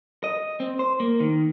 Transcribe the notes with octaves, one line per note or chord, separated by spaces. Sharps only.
D#5
C4
C5
A#3
D#3